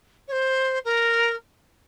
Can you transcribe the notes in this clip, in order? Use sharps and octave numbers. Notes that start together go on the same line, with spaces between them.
C#5
C5
A#4